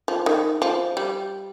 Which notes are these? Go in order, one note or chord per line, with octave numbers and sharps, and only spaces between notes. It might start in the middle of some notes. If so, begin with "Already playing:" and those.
F3
D#3
F3
G3